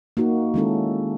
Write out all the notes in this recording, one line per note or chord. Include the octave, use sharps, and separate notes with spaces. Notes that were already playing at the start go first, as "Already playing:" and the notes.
A#3 D#4 F#4
D#3 G#3 C#4 E4 A4